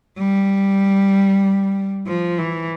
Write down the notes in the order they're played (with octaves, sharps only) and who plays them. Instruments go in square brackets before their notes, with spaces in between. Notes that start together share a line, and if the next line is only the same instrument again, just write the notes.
[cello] G3
F3
E3